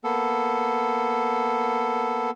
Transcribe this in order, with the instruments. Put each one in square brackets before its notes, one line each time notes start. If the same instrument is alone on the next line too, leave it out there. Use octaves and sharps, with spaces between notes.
[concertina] A#3 B3 A4